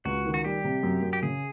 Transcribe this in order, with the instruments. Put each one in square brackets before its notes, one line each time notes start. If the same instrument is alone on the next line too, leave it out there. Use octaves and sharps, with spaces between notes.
[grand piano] C#2 [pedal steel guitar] F#4
[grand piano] D#3
[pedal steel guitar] F#4
[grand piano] G3 [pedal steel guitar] G4
[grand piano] C3
F#2
F#2
[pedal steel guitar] G4
[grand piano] C#3 [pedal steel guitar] G#4